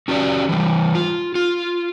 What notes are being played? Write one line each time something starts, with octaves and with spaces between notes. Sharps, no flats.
C#4 F#4 G4 D5
E3 G3
F4
F4